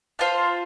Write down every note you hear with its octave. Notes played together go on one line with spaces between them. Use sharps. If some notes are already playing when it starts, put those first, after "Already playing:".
F4 C5 F5 A5